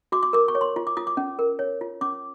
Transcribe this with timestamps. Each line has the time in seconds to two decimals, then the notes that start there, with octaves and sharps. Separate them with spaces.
0.12 F#4 D6
0.23 D6
0.33 A#4 D6
0.48 C#6
0.55 C#5
0.61 C6
0.76 F4
0.87 D6
0.97 F4 D#6
1.07 D6
1.17 C#4
1.39 A#4
1.59 C#5
1.81 F4
2.01 C#4 D6